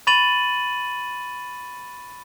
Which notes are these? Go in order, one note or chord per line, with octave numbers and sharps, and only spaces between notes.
B5 C#6 A6 D#7 F#7